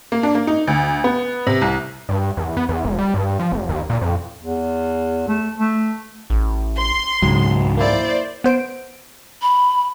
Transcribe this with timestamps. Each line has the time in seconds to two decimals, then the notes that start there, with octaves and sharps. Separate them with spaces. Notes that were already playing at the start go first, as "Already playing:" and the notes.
0.12 A#3
0.23 D4
0.35 A#3
0.47 D#4
0.67 D2
1.04 B3
1.47 C3
1.61 C2
2.09 G2
2.37 E2
2.57 B3
2.69 E2
2.84 E1
2.98 G3
3.14 G2
3.39 F3
3.52 F1
3.69 D#2
3.90 A#2
4.01 F2
4.42 E2
5.28 A3
5.58 A3
6.30 A1
6.77 C6
7.22 E1 C#2 G#2 F#3
7.77 A#3 E4 C5 D5
8.44 B3 C5 D7
9.42 B5